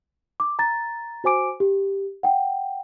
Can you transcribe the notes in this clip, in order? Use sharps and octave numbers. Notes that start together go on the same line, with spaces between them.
D6
A#5 A6
F#4 C5 G#5 D6 D7
G4
F#5 G5